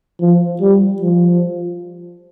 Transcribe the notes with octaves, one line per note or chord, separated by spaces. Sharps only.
F3
G3
F3